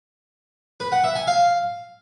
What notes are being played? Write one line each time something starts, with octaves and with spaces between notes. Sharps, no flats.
B4
F#5
E5
G#5
F5